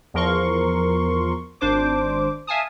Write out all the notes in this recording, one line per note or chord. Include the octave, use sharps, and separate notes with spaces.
E2 F3 A#4 C6 C#6
G#1 D4 C5 D6
E5 F5 G#5 A5 D#6